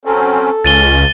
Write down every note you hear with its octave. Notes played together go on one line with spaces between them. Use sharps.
F#3 C4 C#4 A4
C#2 C#4 A6 D#7 G7